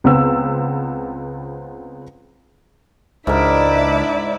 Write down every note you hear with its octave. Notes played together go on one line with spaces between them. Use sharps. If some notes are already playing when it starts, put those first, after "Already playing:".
C#2 B3 C4 E6
C#2 G#2 D4 E4 A#4 D5 E5